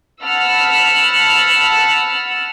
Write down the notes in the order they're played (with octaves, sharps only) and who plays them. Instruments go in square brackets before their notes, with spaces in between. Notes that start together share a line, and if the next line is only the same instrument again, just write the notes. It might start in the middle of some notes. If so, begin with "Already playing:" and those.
[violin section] F#5 A5 B5 E6 F6